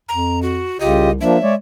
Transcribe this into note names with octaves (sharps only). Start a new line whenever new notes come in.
F2 A#5
F#4
C2 C#3 F4 G4 D#5
F3 A#3 D4 E5
G#3 C#5 D5